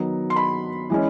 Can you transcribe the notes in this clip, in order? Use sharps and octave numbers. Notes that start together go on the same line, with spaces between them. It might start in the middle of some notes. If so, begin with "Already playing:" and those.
Already playing: D#3 F#3 B3 A#5
C6
B5
E3 G#3 C#4